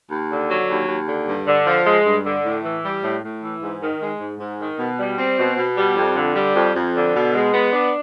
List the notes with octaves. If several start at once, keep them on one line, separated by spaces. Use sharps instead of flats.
D#2
D3
F#3
D#2
D#2
D3
G2
D3
F3
G#3
G2
D3
A2
E3
G3
A2
A2
E3
G#2
D#3
G#3
G#2
G#2
D#3
B2
G3
C4
B2
B2
G3
F2
D3
G3
F2
F2
D3
B2
G#3
B3
D4